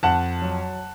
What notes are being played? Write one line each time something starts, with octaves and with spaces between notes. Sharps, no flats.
F2 F#5 A5
F#3